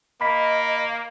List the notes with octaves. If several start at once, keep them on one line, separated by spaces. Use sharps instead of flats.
A#3 D#5 B5 B6